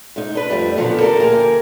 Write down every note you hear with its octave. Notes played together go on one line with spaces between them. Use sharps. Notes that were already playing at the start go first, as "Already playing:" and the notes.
G#2 D#4
D4 B4
F2 F3 G3 A3
A#2 D3 F3 F#3 B3
D3 G3 C4 A4 A#4
D2 A#3 G4 G#4 A#4